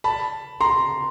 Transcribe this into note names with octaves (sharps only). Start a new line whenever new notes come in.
A5 B5
A#5 C6